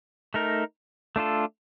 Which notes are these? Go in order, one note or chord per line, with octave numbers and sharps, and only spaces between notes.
A3 D#4 A#4
A3 D4 F4 A4